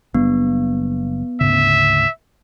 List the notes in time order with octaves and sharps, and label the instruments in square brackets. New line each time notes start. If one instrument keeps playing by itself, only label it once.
[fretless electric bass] F#1 G3 D4 [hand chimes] B3
[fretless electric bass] D2 G#2 C#3 [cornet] E5